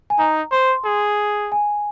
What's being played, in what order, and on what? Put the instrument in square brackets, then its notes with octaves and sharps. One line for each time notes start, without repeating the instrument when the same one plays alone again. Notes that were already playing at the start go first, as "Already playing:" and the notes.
[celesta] G#5
[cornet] D#4 [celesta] A#5
[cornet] C5 [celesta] C6
[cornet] G#4
[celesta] G#5